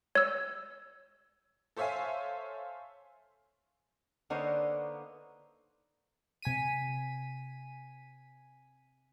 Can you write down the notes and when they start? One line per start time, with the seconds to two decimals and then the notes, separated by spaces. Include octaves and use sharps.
0.15 C#5 E6
1.77 A4 C5 C#5 E5 F5 G#5
4.30 D3 A#3 B3 D#4 C5 C#5
6.42 C3 G#5 B6 D#7